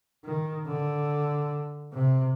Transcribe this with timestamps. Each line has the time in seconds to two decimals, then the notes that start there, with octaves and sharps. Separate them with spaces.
0.25 D#3
0.66 D3
1.93 C3